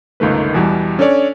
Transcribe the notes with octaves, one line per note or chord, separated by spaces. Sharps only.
G1 C#2 D#3 A3 B4
E2 B2 E3 G3
C#4 D4 A4 C#5 D5